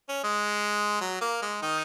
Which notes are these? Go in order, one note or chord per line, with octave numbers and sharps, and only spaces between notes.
C#4
G#3
F#3
A#3
G#3
D#3 D#4